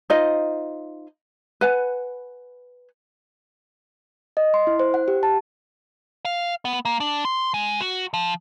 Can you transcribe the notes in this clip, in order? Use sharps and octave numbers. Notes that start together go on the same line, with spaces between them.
D#4 F4 C5 D#5
B4 F#5 G#5
D#5
C6
E4
C5
F#5
G4
A5
F5
B3
A#3
D4
C6
G#3
F#4
F3